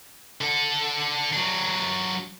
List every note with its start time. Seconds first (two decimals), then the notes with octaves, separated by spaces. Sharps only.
0.41 D3 A4
1.33 F#3 D4